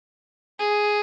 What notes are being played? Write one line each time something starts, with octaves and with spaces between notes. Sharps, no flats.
G#4